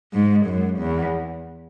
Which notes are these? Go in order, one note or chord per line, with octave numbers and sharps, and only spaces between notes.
G#2
F#2
E2